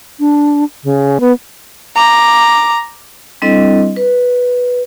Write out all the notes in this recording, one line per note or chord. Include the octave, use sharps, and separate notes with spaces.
D4
C#3
B3
A#5 D6
G3 C4 D4 E4 A4 D#5
B4